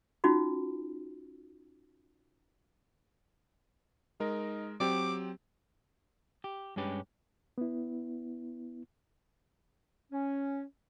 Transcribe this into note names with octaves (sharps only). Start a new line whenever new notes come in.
C#4 D#4 F4 F#4
G#3 D#4 A#4
F#3 C4 G4 D6
G4
G2 G#3 C#4 G4 B4
B3 E4
C#4